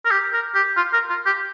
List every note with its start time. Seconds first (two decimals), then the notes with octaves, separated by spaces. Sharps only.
0.05 A#4
0.11 G4
0.33 A#4
0.55 G4
0.77 F4
0.94 A#4
1.10 F4
1.26 G4